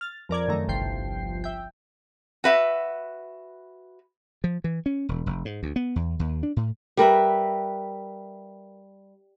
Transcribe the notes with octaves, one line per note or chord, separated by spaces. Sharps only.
F6 A6
F2 A#4 D5 G#6
F#2 D#3 A3 A#5
G1 C2 F3 G5 C7
E5 G5
F#4 B4 E5
F3
E3
C#4
E1
F1
G#2
D2
B3
E2
D#2
D4
A2
G3 A#4 B4 E5